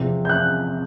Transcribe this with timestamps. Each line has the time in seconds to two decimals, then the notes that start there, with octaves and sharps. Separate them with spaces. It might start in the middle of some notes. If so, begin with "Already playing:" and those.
Already playing: E2 C3 F3
0.25 G6
0.29 F#6